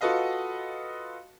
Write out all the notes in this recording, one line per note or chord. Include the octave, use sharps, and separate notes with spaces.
F4 F#4 A4 B4 D#5 F5